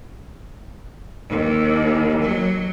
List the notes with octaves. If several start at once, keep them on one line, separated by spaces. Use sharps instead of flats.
D#2
F#3